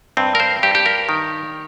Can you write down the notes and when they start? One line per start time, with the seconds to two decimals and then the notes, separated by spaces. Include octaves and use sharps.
0.17 G2 C4
0.35 A#4
0.40 C5
0.63 G2 G4
0.75 G4
0.86 A#4
1.09 D#3